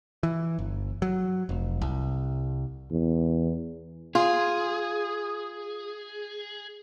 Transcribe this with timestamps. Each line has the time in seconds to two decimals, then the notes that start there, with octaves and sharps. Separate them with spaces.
0.23 E3
0.59 G1
1.02 F#3
1.49 F1
1.81 C2
2.91 E2
4.15 F4 G#4